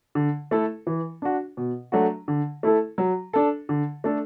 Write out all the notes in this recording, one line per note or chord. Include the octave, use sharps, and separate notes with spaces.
D3
A3 E4 A4
E3
D4 F#4
B2
F#3 A3 D4 F#4
D3
A3 E4 A4
F#3
D4 A4
D3
A3 D4 A4